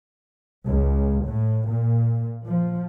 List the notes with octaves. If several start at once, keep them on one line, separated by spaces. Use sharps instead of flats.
C#2
A2
A#2
F3